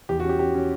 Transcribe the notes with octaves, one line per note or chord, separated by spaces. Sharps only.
E2 G4
F#4
C#4 G4
C#4 G4
C#4